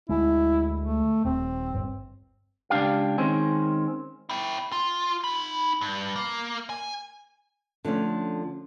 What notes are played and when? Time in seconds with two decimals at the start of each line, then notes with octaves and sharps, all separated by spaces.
0.09 D2 G#3 E4
0.80 A3
1.25 D#1 C4
1.74 G1
2.70 C#2 A#2 D4 G4 F5
3.18 D#3 G#3 C4 C#4
4.30 E4 G5
4.72 F4
5.24 D#4 B5
5.81 G2
6.16 A#3
6.70 G#5
7.84 D3 F3 A3 C#4